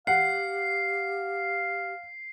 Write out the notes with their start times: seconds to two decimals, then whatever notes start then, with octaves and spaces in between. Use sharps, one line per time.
0.07 G4 F5 F#5 C7